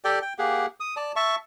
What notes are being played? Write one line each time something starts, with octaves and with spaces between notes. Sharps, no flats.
G4 A4 D5 G5
G5
A#3 G4 G#4 F#5
D#6
D5 A5
E5 A5 C#6